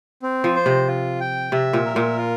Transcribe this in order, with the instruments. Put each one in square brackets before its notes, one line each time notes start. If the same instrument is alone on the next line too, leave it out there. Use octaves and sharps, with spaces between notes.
[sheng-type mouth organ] C4
[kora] F3
[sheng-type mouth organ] C5
[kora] C3
[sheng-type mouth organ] F4
G5
[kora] C3 [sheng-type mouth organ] E5
[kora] A#2
[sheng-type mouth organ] A#4
[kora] A#2
[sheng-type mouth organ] F4